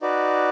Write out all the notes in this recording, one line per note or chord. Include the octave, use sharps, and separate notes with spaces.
D#4 F#4 B4 D5